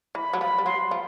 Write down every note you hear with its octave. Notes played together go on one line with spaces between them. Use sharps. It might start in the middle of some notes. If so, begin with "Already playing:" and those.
E3 B5
F#3
F3 B5
G3
F#3 C6
F3